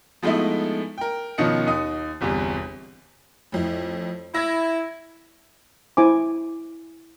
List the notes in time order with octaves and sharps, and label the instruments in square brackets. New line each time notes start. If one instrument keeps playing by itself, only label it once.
[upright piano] F3 G#3 A3 B3 D#4 E4
A#4 G5
B2 D#3 F3 C#4 D#5 C#7
D#2 D#4 D#6
G1 E2 C3 G3
[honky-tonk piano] A1 F2 E4
[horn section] E4 [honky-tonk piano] G#6 A#6
[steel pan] E4 C5 G#5 D6